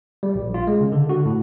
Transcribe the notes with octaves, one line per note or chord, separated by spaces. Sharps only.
G3
A#1
F4
G#3
C#3
D3
F#4
A2